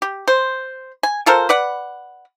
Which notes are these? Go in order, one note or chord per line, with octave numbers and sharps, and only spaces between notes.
G4
C5
G#5
F4 A4 A#4 C5
B4 D5 F#5